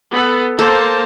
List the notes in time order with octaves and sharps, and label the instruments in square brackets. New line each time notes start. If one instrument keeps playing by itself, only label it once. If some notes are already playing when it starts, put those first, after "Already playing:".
[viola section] B3 A4
[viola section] A#3 C5 A5 [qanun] A4